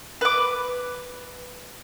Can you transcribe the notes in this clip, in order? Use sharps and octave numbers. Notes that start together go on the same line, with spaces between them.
B4 D6